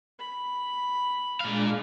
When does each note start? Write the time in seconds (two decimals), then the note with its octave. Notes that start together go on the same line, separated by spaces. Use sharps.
0.19 B5
1.40 A#2 G#3 D4 F5